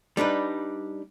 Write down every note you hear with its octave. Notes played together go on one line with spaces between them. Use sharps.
G3 D4 D#4 B4